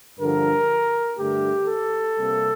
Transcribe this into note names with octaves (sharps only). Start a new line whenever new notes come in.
G2 D3 F3 A#4
G2 D3 A3 G4
A4
C3 G3 A#3